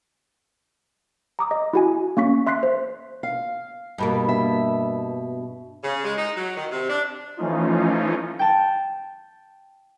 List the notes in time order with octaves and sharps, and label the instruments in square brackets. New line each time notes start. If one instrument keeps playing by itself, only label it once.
[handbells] A#5 D6 D#6
D#5
E4 F#4 G#5
A#3 C#4 C#6 B6
E5 C6 F#6 B6 C7
C5
[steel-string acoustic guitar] F5
[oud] G2 B2 A#3
[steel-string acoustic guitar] E5
[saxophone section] C#3
G#3
D#4
F#3
D#3
C3
D4
[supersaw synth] E3 F3 A3 C#4 D#4 F4
[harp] G5 A5